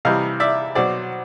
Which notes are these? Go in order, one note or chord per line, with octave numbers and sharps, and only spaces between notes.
C3 E3 G3 D#5 F5
D5 E5
B2 F#3 C5 D5